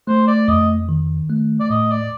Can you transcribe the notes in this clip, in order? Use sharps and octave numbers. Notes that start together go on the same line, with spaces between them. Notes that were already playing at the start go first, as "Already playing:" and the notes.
A3 C5
D5
F2 D#5
D#3
A3
D5
A2 D#5
D5